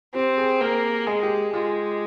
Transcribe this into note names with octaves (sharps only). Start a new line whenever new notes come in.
C4 G4
G#4
A#3 A#4
G#3 G#4
G4
G#3 F4